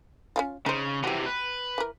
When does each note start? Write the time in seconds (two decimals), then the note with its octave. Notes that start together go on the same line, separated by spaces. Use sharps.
0.36 C#4 E4 F4
0.66 C#3 D#4 C5
1.04 C3 E3 F#4 G4
1.26 B4
1.78 E3 A#4